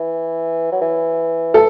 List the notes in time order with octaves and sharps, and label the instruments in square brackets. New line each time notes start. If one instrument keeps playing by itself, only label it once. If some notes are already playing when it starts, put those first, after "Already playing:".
Already playing: [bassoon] E3
F#3
E3
[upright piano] A4